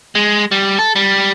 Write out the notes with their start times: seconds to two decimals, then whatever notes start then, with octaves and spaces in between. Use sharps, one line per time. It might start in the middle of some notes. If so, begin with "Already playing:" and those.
0.15 G#3
0.51 G3
0.79 A4
0.96 G3